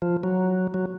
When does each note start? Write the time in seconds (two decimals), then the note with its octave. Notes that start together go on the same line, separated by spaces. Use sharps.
0.02 F3
0.23 F#3
0.74 F#3